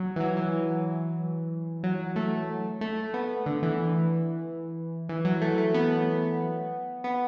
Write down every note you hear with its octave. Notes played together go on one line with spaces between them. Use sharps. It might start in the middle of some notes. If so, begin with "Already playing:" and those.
Already playing: F#3
E3
F#3
E3
F#3
A3
A3
B3
D3
E3
E3
F#3
A3
A3
B3
B3